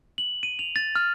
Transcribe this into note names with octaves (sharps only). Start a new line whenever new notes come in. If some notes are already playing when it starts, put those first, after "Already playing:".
F#7
D#7
F7
A6
F6